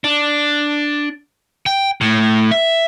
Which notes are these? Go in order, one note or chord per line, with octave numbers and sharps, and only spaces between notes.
D4
G5
A2
E5